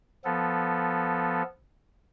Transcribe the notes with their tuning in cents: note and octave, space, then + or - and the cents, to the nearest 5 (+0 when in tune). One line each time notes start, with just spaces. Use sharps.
F3 +0 B3 +0 A4 +0